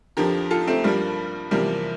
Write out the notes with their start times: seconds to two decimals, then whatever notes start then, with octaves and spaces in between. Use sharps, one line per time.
0.17 F2 D3 F3 G4 A#4
0.51 F4 A4
0.67 A3 C4
0.84 G2 F3 G3 A#3
1.51 E2 C3 F3 G3 A#3